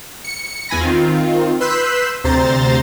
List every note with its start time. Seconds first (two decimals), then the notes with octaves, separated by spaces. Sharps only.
0.24 C#7
0.69 E2 E3 G#5 B5 A#6
0.81 D#3 C4 F4
1.61 B4 C6 E6 F#6 G6 B6
2.24 D2 C3 C5 A#5 C6 A6